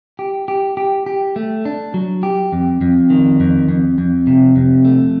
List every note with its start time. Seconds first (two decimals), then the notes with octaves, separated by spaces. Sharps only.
0.19 G4
0.48 G4
0.77 G4
1.06 G4
1.36 A3
1.65 D4
1.94 F#3
2.23 G4
2.52 F2
2.81 F2
3.10 D#3
3.40 F2
3.68 F2
3.98 F2
4.27 C3
4.56 F2
4.85 A3